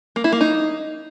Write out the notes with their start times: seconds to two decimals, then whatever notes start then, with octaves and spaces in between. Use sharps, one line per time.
0.16 A#3
0.24 E4
0.32 A#3
0.41 D#4